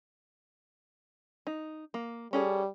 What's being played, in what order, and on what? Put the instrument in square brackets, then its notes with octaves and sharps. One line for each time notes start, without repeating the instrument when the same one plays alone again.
[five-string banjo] D#4
A#3
[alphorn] G3 [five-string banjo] C#4 G#4 A4